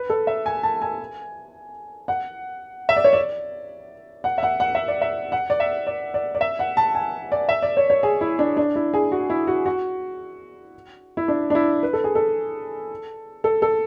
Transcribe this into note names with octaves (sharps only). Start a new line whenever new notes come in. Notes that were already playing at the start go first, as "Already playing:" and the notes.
Already playing: B4
A4
E5
G#5
A5
G#5
F#5
E5
D5
C#5
D5
F#5
E5
F#5
F#5
E5
D5
E5
F#5
D5
E5
D5
D5
D5
E5
F#5
A5
G#5
D5
E5
D5
C#5
C#5
G#4
E4
D4
D4
E4
G#4
F#4
E4
F#4
F#4
E4
D4
D4
E4
B4
A4
G#4
A4
A4
A4